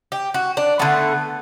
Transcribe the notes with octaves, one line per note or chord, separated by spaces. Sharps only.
G4
F#4
D4
D3 A3 B3